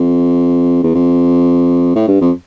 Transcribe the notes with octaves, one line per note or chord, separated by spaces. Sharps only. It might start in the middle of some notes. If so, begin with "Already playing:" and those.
Already playing: F2
E2
F2
A2
G2
F2